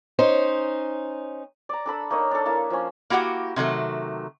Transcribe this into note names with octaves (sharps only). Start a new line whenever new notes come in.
C#4 D#4 C5
D5 A#5
D4 A4 B5 E6
A#3 D#4 C#5 D#5
D4 A4
A#3 E4 E5 F5
F3 C#4
A#3 E4 F#4 G4 F#5
C3 D#3 F#3 A3